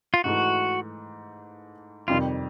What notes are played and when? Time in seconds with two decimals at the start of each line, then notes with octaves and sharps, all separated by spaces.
0.14 F4
0.24 G#2 E3 A3 F#4
2.08 F2 C3 D#3 G3 F4